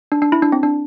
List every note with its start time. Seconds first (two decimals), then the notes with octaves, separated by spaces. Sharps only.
0.12 D4
0.22 D4
0.32 E4
0.42 D4
0.52 C4
0.63 D4